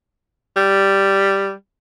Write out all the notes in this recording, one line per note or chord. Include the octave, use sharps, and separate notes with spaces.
G3